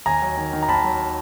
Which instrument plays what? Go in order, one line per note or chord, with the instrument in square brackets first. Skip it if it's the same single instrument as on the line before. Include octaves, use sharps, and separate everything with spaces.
[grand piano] D#2 G#5 A#5
F#3
D#3
D#3
A#5
D#2 A5 B5
F#3